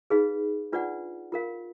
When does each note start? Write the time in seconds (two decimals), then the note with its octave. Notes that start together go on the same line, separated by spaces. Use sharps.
0.10 D#4 G#4 B4 F5 B5
0.72 D4 F4 B4 D5 F#5
1.32 F4 A#4 F5